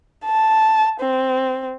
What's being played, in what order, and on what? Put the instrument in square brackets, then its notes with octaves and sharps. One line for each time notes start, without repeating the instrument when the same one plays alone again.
[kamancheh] A5
C4